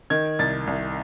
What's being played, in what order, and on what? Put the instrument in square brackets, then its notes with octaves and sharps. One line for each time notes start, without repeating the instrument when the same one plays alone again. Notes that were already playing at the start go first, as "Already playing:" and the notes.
[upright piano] D#3 G#6
C2 A6
C2